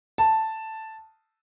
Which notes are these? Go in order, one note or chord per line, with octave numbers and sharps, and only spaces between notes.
A5